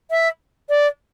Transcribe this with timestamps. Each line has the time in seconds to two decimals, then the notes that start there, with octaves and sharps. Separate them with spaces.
0.11 E5
0.69 D5